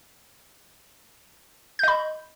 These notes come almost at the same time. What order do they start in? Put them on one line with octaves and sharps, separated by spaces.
G6 D#5 B5